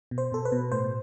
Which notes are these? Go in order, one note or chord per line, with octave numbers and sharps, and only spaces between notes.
B2
C5
B2 A4
B4
B2
A2 C5